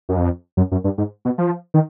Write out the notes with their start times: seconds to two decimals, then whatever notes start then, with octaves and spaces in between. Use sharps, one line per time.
0.09 F#2
0.17 F2
0.57 F#2
0.72 F#2
0.84 G2
0.98 G#2
1.25 B2
1.38 F3
1.74 D#3